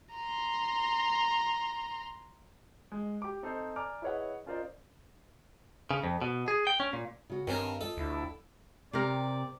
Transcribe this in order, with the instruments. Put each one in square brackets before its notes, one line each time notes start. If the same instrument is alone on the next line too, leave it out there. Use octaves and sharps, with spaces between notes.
[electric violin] A#5 C6
[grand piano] G#3
G4 D6
C4 D#4 A4 C5
D5 G#5 A#5 D6 F6
E4 G#4 B4 C#5 D#5 F#5
C#4 F4 A#4 C5 D5 D#5
[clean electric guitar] C#3
F2
B2
G#4
G5
C#4
A#2
[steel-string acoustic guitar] C#3 F#4
[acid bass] G2 [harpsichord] D#3 C#4 A#4 [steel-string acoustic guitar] C4
[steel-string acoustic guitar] F4 D#5 [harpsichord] A4
[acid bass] D2 [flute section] D4 E4
[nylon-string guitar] C3 G4 A#4 [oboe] D5